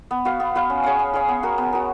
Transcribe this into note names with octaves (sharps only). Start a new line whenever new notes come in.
B3
F#4 B4 F5
B3
F#4 B4 F5
C#4
G#4 C#5 F5
C#4
G#4 C#5 F5
B3
F#4 A#4
B3
F#4 A#4